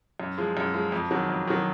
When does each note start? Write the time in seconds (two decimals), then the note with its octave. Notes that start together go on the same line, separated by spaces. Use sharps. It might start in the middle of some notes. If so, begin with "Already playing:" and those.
0.20 F#2
0.38 F3 G#3
0.57 F#2
0.74 F3 G#3
0.92 F2
1.11 D#3 F#3
1.29 F2
1.47 D#3 F#3